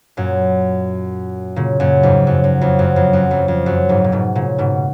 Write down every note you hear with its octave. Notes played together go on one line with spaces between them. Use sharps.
F#2 A#2
A#2 C#3
F#2 A#2
F2 G#2
F#2
F#2
F2
F#2
F2
F#2
F2
F2
F#2
F2 G#2
A#2
G#2 B2
A#2 C#3
G#2 B2